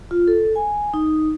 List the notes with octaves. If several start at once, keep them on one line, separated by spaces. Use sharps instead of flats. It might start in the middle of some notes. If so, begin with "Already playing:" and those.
F4
A4
G#5
D#4